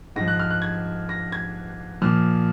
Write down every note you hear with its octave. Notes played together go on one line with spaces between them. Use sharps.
G#2 F3 A#6
F#6
F6
F#6
G#6
A#6
G#6
A#2 F3 F6